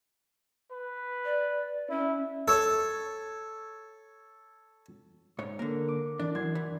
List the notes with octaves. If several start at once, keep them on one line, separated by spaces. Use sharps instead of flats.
B4
D5
C#4 E4
A4 C#5
G#2 C#5
D3 A#3 A#4
D6
E3 D4
F#2 D4 C6 G#6
E3